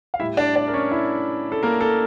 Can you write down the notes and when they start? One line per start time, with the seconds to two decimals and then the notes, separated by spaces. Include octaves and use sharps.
0.14 F5
0.20 A2 G3 E4 E5
0.37 D4 D5
0.56 D4 D5
0.68 A#4
0.74 C#4 C#5
0.91 E4 E5
1.52 A4
1.63 A#3 A#4
1.81 A4